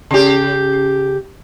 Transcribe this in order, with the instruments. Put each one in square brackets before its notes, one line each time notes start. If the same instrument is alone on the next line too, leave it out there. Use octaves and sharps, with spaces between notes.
[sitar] C#3 G4